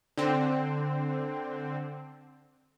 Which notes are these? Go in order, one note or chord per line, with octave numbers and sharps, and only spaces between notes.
D3 C4